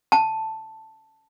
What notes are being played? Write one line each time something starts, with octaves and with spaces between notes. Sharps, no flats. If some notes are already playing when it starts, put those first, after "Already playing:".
A5